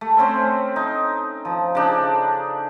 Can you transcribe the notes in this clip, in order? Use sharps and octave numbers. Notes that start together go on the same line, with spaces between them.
A3
C4 C#4 E5 C6
D#4
F3
C#3 D4 D#4